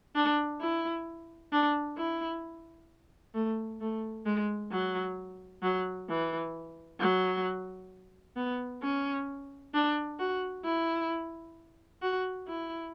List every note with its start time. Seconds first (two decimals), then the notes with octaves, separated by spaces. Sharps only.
0.15 D4
0.61 E4
1.52 D4
1.97 E4
3.34 A3
3.81 A3
4.26 G#3
4.71 F#3
5.63 F#3
6.09 E3
7.00 F#3
8.36 B3
8.82 C#4
9.74 D4
10.19 F#4
10.64 E4
12.02 F#4
12.47 E4